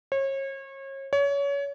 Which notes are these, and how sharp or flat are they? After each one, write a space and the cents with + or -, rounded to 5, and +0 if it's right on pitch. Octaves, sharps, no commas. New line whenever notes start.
C#5 -35
C#5 +25